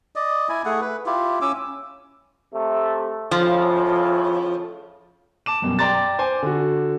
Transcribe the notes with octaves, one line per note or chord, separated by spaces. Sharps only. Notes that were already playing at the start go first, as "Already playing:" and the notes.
D5 D#5
E4 G#5
A3 G#4 F#5
B4
E4 F4 G4
C#4 D6 E6
C3 A3
F2 A2 C#3 F3
A5 D6 E7
F#2 B2 G3
D5 G5 A#5 C6 D6 A6
C5 G#5 D6
D3 F#4